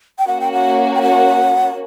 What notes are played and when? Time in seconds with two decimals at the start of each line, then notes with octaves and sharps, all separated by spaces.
0.19 G5
0.27 A#3 C#4 F#4 F#5
0.41 G5
0.53 F#5
0.95 G5
1.02 F#5